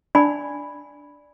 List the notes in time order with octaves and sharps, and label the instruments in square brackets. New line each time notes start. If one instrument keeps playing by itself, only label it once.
[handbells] D4 [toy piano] D5 G#5 B5